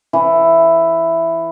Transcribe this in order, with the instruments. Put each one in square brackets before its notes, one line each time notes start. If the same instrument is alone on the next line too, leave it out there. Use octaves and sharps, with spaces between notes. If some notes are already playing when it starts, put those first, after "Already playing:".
[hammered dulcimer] E3